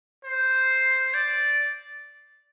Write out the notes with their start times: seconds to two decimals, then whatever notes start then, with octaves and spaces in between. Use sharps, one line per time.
0.24 C5
1.14 D5